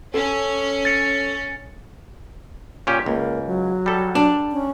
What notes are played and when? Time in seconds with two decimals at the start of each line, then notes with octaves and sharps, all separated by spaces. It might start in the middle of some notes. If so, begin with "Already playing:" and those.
0.14 C#4 A4
0.85 A6 C#7
2.87 A#2 C#4 G4
3.06 C#2 A#3
3.46 F#3
3.86 G3 A4
4.15 D4
4.52 C#4